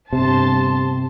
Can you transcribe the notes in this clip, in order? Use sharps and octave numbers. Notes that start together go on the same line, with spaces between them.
G1 C3 A5 C6